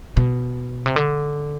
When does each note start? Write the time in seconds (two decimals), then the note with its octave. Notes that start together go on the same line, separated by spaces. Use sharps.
0.17 B2
0.86 C3
0.96 D3